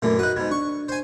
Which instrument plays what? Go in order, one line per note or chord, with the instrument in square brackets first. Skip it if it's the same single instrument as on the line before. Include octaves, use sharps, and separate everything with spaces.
[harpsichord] F#2 D3 E3 [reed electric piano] A#2 A3 A#4
[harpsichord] D#4 B4 [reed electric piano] F#4 F#6
[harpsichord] G#2 B2 [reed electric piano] G#6
[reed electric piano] D4 [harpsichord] C#6
[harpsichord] C5 G#5